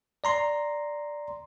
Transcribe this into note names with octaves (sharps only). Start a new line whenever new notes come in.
D5 A#5 C6